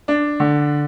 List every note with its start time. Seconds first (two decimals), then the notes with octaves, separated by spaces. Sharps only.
0.08 D4
0.40 D3